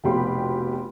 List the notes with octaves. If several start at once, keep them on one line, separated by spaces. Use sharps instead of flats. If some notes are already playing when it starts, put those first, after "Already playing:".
F1 A#1 B2 G4 B5 C6